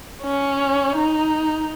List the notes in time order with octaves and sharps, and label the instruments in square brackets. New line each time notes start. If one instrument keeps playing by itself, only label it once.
[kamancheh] C#4
D#4